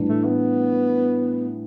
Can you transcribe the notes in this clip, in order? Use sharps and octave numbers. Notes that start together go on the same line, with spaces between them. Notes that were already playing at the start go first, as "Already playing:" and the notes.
Already playing: A2 E3 G3 D4
A3
B3